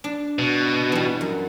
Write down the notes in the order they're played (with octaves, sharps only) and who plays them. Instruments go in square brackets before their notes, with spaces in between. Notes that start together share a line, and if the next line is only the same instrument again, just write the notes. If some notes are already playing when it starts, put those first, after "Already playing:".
[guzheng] D4
[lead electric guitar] B2
[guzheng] E3 G3
F#2